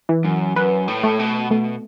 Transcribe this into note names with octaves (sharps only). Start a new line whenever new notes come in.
E3
F#2
F#2 B4
A2
A3
B2
B2 A3